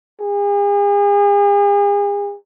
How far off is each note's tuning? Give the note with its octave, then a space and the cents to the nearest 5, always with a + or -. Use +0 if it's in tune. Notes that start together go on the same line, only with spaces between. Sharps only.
G#4 -40